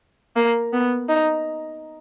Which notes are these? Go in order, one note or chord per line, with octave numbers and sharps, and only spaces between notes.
A#3
B3
D#4